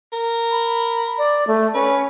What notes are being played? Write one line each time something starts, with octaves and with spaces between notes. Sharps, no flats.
A#4
B5
D5
A3
C#4 B4